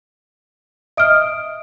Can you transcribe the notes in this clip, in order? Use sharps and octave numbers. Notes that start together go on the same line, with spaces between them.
D#5 E5 D#6 F6 D7